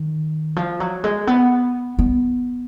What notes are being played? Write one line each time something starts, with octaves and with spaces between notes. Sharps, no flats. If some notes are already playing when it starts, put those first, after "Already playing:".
Already playing: D#3
F3
F#3
G#3
B3
B3